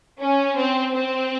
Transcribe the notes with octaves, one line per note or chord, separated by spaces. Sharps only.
C#4
C4
C4